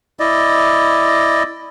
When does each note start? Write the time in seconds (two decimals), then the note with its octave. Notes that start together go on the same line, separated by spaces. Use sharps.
0.20 E4 D5 D#5